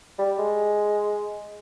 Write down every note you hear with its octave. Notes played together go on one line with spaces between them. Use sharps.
G3
G#3